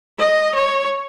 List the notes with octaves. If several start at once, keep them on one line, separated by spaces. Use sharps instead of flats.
D#5
C#5